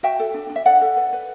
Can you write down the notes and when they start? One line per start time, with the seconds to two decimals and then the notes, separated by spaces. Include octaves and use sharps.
0.03 F#4 E5 G5
0.19 A4
0.34 D4
0.50 D4
0.56 E5
0.66 A4 D5 F#5
0.81 A4
0.96 B4
1.13 B4